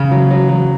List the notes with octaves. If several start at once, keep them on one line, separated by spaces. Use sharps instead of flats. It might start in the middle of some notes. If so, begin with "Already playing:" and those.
Already playing: C#3
F#3
F#3
F#3